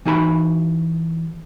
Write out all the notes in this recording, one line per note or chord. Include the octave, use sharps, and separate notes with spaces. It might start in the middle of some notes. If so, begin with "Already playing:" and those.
E3 D#4 F#4 G#5 B5